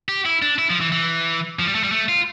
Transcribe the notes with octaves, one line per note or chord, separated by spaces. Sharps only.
G4
E4
D4
E4
F3
E3
E3
F3
G3
A3
G3
A3
F4